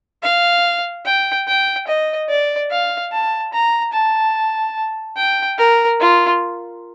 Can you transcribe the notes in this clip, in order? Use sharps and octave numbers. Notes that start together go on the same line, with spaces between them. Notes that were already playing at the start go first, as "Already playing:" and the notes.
F5
G5
G5
D#5
D5
F5
A5
A#5
A5
G5
A#4
F4